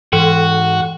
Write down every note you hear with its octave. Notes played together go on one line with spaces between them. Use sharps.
G#2 E3 F#4